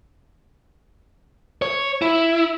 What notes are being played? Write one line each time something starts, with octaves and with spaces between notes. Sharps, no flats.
C#5
E4